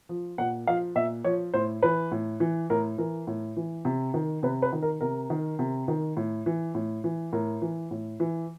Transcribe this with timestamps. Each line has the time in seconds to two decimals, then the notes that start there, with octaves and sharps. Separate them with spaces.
0.09 F3
0.38 A#2 F#5
0.67 F3 F5
0.96 A#2 E5
1.24 F3 C#5
1.54 A2 C5
1.82 E3 B4
2.12 A2
2.40 E3
2.70 A2 A#4
2.98 E3 A#4
3.27 A2
3.56 E3
3.85 C3
4.14 D#3
4.43 C3 B4
4.62 B4
4.72 D#3
4.82 A#4
5.01 C3 A#4
5.30 D#3
5.59 C3
5.88 D#3
6.17 A2
6.46 E3
6.75 A2
7.04 E3
7.33 A2 A#4
7.62 E3
7.91 A2
8.20 E3